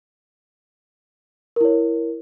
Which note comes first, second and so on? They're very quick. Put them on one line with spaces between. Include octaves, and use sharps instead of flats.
A#4 E4 C#5